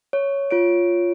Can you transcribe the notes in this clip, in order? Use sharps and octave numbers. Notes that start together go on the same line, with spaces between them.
C#5
F4 C#5 D7